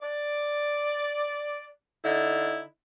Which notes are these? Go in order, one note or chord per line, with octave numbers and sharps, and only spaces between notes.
D5
D3 D#4 E4